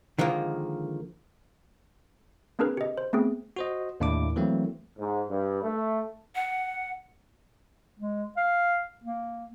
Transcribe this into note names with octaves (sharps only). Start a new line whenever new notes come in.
D3 D#3 F3 G#3 A#3
A#3 C4 D4 G#4 A#4 B4
G4 D#5
C5
A3 B3 C4 G#4
F#4 C5 D#5
D#2 A2 A#3 D4 E4 D6
E3 F#3 A3 A#3 C4
G#2
G2
A3
F#5
G#3
F5
A#3